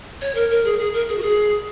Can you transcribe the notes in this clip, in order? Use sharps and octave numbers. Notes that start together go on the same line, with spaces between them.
C#5
A#4
A#4
G#4
G#4
A#4
G#4
F#4
G#4